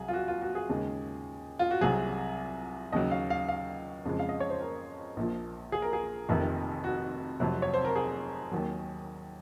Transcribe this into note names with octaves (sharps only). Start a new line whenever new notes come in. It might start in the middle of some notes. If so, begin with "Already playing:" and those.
Already playing: C2 F#3 G#4
F4
F#4
F4
F#4
G#4
D#2 C#3 G#3
F4
F#4
C2 C3 F#3 G#4
D#2 C#3 F#3 D#5
F5
F5
F5
F2 C#3 F3 G#3
F5
D#5
C#5
C5
A#4
A#1 A#2 F3
G#4
A#4
G#4
F1 F2 C3 D#3
F#4
F1 F2 C3 F#3
C#5
C5
A#4
G#4
D#2 D#3 F#3